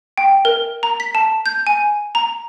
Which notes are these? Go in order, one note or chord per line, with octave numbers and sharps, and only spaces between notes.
G5
A#4
A#5
B6
A5
G6
G#5
A#5